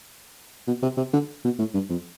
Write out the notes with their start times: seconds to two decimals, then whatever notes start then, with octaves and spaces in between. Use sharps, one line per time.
0.67 B2
0.83 C3
0.97 C3
1.13 D3
1.45 B2
1.59 A2
1.74 G2
1.90 F2